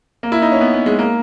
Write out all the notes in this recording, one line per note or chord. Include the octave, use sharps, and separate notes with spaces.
A#3
E4
D#4
C#4
B3
B3
G#3
A#3